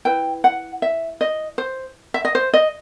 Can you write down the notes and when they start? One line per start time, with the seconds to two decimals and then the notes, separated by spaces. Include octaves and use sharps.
0.05 E4 B4 G5
0.44 F#5
0.82 E5
1.21 D#5
1.58 C5
2.14 E5
2.25 D#5
2.35 C5
2.54 D#5